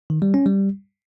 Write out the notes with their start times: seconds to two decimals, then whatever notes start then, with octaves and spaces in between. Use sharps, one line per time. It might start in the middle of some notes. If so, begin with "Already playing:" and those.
0.10 D#3
0.22 G3
0.34 C#4
0.46 G3